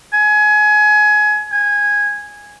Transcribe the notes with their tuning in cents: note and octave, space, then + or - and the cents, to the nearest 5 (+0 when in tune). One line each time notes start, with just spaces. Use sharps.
G#5 +25
G#5 -10